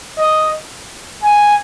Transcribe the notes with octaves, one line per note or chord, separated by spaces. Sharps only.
D#5
G#5